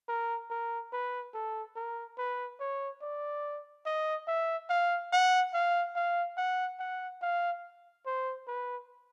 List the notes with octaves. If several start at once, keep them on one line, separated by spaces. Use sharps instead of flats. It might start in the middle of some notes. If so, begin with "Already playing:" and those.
A#4
A#4
B4
A4
A#4
B4
C#5
D5
D#5
E5
F5
F#5
F5
F5
F#5
F#5
F5
C5
B4